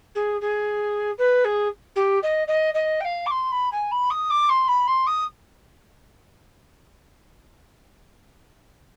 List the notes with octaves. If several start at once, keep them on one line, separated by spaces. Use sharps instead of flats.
G#4
G#4
B4
G#4
G4
D#5
D#5
D#5
G5
F5
D6
C6
B5
G#5
B5
D#6
D6
C6
B5
C6
D#6